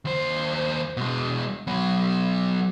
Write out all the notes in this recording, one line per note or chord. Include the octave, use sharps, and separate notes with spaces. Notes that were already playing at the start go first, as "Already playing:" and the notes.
D#2 C5
B2 G#3
F#3 B3